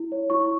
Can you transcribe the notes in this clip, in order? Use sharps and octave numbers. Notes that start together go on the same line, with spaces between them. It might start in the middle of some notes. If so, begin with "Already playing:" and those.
Already playing: E4
C#5
E4 C#6